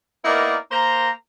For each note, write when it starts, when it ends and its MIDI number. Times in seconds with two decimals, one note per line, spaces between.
0.25 0.56 58
0.25 0.56 59
0.25 0.56 63
0.25 0.56 64
0.25 0.56 70
0.25 0.56 74
0.72 1.10 58
0.72 1.10 72
0.72 1.10 82